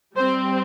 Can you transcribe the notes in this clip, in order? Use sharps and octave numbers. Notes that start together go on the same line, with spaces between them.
G3 C4 C5